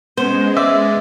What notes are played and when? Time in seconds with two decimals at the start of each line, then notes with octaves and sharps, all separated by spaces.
0.17 G#3 B3 C#4 C5
0.57 D5 E5